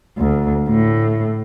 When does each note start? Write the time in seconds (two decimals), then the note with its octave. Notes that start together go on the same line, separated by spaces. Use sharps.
0.18 D2
0.69 A2